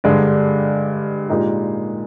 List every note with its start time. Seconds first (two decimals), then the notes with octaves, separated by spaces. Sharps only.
0.04 G2 D3 G#3 D4
1.29 A#2 G#3 D#4 G4